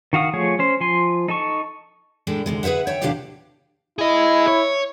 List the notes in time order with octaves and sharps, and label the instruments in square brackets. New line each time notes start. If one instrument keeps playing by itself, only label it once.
[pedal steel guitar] D#3 F#4 F5 D#6
F3 A3 G#4 C#5
C#4 C5
F3 G#5 C6
D#4 A4 A5 C#6
[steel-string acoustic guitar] A2 G#3 D4
D2 C3 G#3
G#4 B4 C#5 E5 F#5
C#5 E5 G5 A5
E2 A2 C3 D4 G4 F5
[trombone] E4 [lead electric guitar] G#4 D#5
[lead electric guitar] C#5